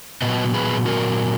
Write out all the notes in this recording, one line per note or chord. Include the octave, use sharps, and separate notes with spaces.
A#2 F#3 B3 B4 D#5
G#4 B4
F#4 A#4